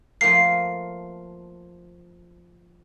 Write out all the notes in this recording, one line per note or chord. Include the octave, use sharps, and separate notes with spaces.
F3 A3 A#3 C7